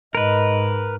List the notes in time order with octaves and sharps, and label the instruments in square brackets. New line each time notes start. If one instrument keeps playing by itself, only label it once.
[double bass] G#2 [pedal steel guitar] A#4 B4 [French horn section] D#5